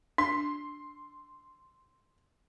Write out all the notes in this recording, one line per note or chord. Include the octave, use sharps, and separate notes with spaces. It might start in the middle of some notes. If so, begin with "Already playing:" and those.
D4 C6